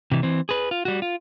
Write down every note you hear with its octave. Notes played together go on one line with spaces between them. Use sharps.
C3 E3
E3 C4
G#4 B4
F4
G3 F#4
F4